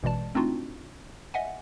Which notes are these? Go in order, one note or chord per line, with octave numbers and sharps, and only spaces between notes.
A1 B2 E3 G#3 D5 A5
A3 C4 D4 D#4 F4 F#4
D#5 E5 F#5 G#5